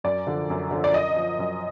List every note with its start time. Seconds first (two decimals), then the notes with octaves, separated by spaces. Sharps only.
0.04 F#2 D5
0.27 D3 F3
0.50 F#2
0.71 D3 F3
0.84 D5
0.94 F#2 D#5
1.16 F3
1.39 F#2